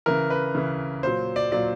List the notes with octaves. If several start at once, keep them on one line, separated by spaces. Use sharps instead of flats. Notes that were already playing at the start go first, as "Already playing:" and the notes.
C#3 E3 A#4
B4
C#3 E3
A#2 F#3 C5
D5
A#2 F#3 D5